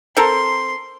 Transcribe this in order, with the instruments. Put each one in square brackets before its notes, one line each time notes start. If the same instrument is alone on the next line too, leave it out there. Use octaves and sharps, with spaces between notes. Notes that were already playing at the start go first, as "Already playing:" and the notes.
[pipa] C4 A4 A#4 [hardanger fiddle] C6